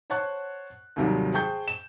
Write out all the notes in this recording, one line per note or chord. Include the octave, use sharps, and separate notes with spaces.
C5 C#5 F#5 A5 C#6 F#6
D#2 G#2 C3 D#3 F#3 G3
G#4 C5 G5 A5 C#6 G6
E7